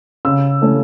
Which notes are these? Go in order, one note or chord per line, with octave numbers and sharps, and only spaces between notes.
C#3 E6
E3 A3 C#4